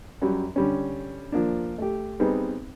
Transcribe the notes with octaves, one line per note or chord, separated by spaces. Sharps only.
F#2 F#3 G3
D3 G3 C#4
F3 A#3 D4
A3 G4
G3 B3 C4 D#4 G#4